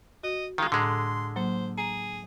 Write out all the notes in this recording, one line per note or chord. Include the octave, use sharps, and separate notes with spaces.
F#4 D#5
D#3 G#3 F4
A2 D3 G#3 A#5 C6
F#3 A#3 C5
G#4 A#5